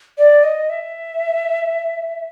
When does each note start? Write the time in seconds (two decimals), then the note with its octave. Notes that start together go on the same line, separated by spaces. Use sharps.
0.18 D5
0.44 D#5
0.69 E5